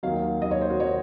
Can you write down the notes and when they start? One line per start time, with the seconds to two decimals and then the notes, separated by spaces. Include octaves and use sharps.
0.03 D#2 D#3 F#3 F5
0.41 D#2 D#3 F#3 D#5
0.51 C#5
0.61 C5
0.70 F#4
0.80 D#3 F#3 C#5